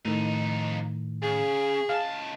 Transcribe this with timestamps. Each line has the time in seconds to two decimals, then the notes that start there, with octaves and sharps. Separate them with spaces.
0.05 F2 A2 D#3 D#4
1.23 C#3 G#4
1.89 C#2 F5 A5